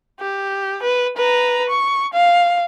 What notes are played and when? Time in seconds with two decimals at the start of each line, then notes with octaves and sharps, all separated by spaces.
0.20 G4
0.82 B4
1.17 B4 A#5
1.69 C#6
2.13 F5